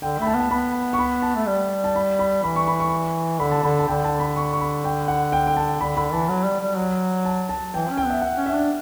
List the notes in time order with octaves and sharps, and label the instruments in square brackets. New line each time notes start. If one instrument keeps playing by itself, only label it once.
[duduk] D3 [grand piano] G5
[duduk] A3 [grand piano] B5
[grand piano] A5
[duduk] B3
[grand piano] A5
[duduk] B3 [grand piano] B5
[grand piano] C#6
B5
A5
[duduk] A3
G3
[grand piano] A5
B5
B5
[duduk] E3 [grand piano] B5
[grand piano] C#6
B5
C#6
[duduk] D3 [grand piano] B5
[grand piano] A5
[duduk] D3 [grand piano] B5
[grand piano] A5
[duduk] D3 [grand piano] G5
[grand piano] A5
B5
C#6
C#6
B5
G5
F#5
G5
G5
A5
[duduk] D3 [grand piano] B5
[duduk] D3 [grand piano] B5
[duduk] E3 [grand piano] A5
[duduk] F#3
G3
G3
F#3
[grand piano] A5
A5
[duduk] E3 [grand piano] G5
[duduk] C#4
[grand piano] G5
[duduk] B3 [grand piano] E5
[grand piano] F#5
[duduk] C#4
[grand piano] E5
[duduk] D4